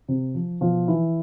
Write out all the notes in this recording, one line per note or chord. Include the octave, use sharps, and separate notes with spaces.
C3
F3
B2 F3 F4
E3 E4